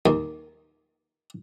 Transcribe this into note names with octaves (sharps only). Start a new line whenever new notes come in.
D#2